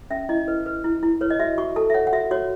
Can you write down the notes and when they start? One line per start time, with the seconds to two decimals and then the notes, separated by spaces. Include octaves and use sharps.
0.11 C#4 E5
0.29 E4 D#5
0.48 B4
0.66 B4
0.84 E4
1.03 E4
1.21 B4 C#5
1.30 D#5
1.39 F#4 E5
1.58 F#4 C#6
1.76 A4 A5
1.90 E5
1.94 C#5 F#5
2.07 F#5
2.13 F#4 E5
2.31 F#4 C#5